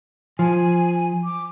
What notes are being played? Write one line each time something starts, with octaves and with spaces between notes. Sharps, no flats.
F3 G#5
D6